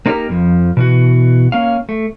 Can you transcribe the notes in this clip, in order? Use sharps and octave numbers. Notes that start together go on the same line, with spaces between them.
A#3 C4 D#4 F4 G4 A#4
F2 F3
B2 E3 F#4
A#3 C#4 F5
A3